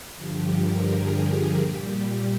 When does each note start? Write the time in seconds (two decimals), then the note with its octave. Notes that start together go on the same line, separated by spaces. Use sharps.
0.16 G2 D3 F3 G4
0.52 A#4
0.87 G#4
1.59 A#2 G3 G4